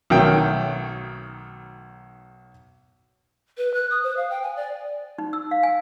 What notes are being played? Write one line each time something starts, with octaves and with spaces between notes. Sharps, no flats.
B1 D#3 F#3 A3 G5
B4
F#6
D#6
C5
F5
G5
G#5
D5
D#4
E6
F5
G#5